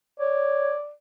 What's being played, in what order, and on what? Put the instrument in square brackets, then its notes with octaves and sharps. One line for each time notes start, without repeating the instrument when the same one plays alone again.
[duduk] C#5 [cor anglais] D5